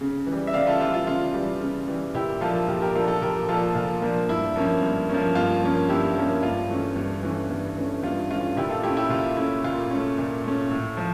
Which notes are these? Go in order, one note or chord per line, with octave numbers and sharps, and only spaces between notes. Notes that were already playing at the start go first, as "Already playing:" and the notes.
C#3
E3
G3
E5
C#3 D5 F5
F4 A4
E3 G3 F4
F4
C#3 F4
E3 G3
C#3
E3 G3
A#2 E4 G4
F3 A#3 D4 F4 A4
A#2 G4 A#4
G4 A#4
F3 A#3 D4 F4 A4
F4 A4
A#2 G4 A#4
F3 A#3 D4 F4 A4
A#2 F4
F3 A#3 D4
G2 E4
F3 A#3 C#4
G2
F3 A#3 C#4
G2 F4
F3 A#3 C#4
G2 E4 G4
F3 A#3 C#4
G2 F4
E3 A3 C#4
G2
E3 A3 C#4
G2
E3 A3 C#4
G2 F4
E3 A3 C#4 F4
A#2 E4 G4
F4 A4
A3 E4 G4
C#4
E4 G4
A#2 F4
A3 C#4 E4
A#2 F4
A3 C#4
A#2
A3 C#4
A2
F3